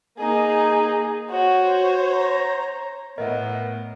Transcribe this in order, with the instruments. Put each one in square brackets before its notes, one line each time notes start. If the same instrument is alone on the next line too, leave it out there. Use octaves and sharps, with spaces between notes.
[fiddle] A#3 D#4 [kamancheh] G#4
[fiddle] F#4 [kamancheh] C5 C#5
[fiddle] A#5
[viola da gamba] A2 [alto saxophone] B3 [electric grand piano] A#4 [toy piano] D#5 E5